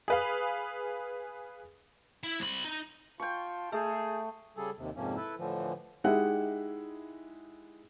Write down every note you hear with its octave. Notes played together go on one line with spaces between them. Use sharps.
G#4 B4 F5
E4
C2 B5
D#4
F4 G5 A5 C#6
A3 G#4
C#3 G3 G#4 A4
D#2 C3
F2 G#2 C3 F3 A#3 C#4
E4 A4 B4
A2 D3 E3 F3
G#3 D#4 E4 G4 F#5